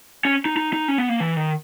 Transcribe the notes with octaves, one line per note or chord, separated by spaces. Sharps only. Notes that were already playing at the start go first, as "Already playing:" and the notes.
C#4
D#4
D#4
D#4
C#4
B3
A#3
E3
D#3